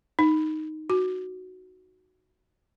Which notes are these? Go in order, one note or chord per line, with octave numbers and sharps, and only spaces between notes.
D#4
F#4